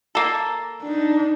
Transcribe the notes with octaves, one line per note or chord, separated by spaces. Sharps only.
A#3 A4
D4 D#4